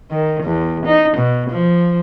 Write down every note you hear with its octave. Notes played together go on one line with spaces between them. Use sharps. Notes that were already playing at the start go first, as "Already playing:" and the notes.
D#3
E2
D#4
B2
F3